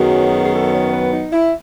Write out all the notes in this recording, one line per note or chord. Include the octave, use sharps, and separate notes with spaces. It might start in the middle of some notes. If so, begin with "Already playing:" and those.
Already playing: F#2 D#3 F#3 B3 G#4
G#4
A4
C#5
B4
D#4
E4